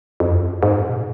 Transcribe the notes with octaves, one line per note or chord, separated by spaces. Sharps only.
F2
F#2
G#2
B2
A#2